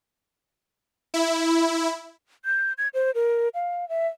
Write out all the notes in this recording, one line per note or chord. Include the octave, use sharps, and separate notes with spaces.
E4
G6
G#6
C5
A#4
F5
E5